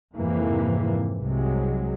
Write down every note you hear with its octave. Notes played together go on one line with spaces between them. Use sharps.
F2 G#2 C3 E3 A#3
C2 C3 F#3 G#3